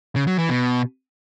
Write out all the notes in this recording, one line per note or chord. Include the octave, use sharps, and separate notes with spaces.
C#3
F#3
E3
B2